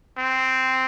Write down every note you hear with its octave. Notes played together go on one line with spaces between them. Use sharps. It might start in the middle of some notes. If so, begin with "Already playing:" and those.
C4